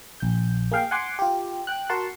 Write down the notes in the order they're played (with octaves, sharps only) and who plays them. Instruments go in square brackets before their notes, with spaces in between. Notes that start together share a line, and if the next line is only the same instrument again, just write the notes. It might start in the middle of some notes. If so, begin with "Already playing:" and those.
[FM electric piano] A#1 G6
A#3 G#4 F5 G5
F#5 G#5 C6 D6
F4 G4
G5 F#6
F#4 A#4 F#5 A5 C6